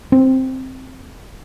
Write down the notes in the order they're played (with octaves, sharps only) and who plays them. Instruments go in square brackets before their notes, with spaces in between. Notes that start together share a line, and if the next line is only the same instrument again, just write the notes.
[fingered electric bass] C4